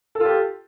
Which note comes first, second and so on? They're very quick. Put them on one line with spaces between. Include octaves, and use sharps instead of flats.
A4 F4 G4